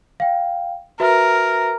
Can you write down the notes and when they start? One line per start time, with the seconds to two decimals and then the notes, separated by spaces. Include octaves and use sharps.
0.20 F5 G5
1.00 F#4 A#4 B4 E5